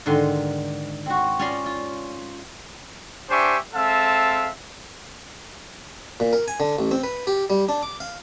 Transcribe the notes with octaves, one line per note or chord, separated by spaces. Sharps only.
G#2 D3 D#3 C6
C4 F#4
C#4 F4 C#5 D5 A#5 C6
F4
D4 G4 C5 E5 G#5 C#6
G#3 C4 A4 E5 F5 A5
A#2
A#4
G#5
D3
A1
C4
B4
G4
G3
D4
D6
F5